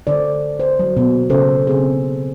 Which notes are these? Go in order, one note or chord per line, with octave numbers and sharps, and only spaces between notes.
D3 D4 C5 D5
C5
F#3
B2 A#3
C#3 A4 C5
C#3 C4 G#4